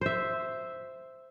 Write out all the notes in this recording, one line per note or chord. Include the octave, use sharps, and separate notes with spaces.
C5 E5